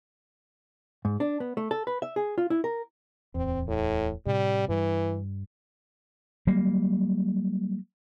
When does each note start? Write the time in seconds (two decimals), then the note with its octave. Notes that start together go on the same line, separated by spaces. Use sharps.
1.05 G#2
1.20 D4
1.40 B3
1.57 A3
1.71 A4
1.87 B4
2.02 E5
2.16 G#4
2.38 F4
2.50 E4
2.64 A#4
3.35 D1 E2 C4
3.68 A2
4.26 A2 C3 G3
4.69 G2 E3 G3
6.47 F#3 G3 A#3